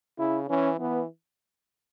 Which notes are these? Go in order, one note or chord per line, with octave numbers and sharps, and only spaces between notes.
C#3 E4
E3 C#4
E3 B3